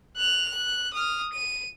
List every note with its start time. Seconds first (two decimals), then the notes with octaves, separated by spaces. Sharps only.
0.17 F#6 F7
0.48 F#6
0.93 D#6 F6
1.33 D#7